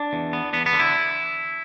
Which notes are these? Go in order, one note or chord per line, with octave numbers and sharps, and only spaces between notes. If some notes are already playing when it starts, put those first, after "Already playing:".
Already playing: D4
E2
B3
E2 B3
B3
D3
E4